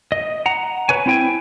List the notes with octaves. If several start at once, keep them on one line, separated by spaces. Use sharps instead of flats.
D#5
F#5 A#5
B4 C#5 G#5
C4 E4 G5 G#5